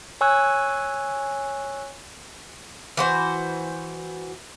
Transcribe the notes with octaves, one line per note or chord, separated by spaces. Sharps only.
C#5 G#5 C#6 E6 F#6
E3 F#4 C5